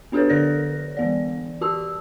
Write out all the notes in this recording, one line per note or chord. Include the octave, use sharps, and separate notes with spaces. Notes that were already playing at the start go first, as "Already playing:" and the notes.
B3 D4 G4 A4 B4 C#5
D3 A4 A#4 C5 D5 A#6
E3 B3 D5
F#4 G4 A5 E6